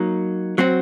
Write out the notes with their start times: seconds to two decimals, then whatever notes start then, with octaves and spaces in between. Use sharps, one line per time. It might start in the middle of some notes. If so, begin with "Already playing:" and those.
Already playing: F#3 A#3 D#4
0.58 F#3 C4 F#4